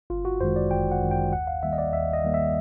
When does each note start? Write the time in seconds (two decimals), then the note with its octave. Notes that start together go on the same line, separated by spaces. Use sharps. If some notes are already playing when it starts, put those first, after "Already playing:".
0.10 G1 F4
0.25 F#4
0.41 F#2 D#3 G#3 C5
0.56 D5
0.71 G1 G5
0.92 F#5
1.01 F#2 D#3 G#3
1.11 G5
1.32 D#2 F#5
1.47 F5
1.63 D#3 G3 A#3 E5
1.73 D#5
1.78 D5
1.93 D#2 E5
2.13 D#5
2.24 D#3 G3 A#3
2.34 E5